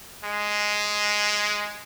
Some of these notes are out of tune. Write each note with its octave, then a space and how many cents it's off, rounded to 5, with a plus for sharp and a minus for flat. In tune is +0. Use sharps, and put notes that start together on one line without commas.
G#3 +0